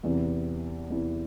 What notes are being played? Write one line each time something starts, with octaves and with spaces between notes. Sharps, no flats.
E2 C3 E3
E2 C3 E3